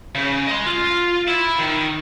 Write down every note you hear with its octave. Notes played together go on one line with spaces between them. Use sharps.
C#3
D#5 C6
F4
E4
D#3